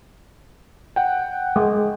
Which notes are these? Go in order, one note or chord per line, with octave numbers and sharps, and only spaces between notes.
F#5 G5
G#3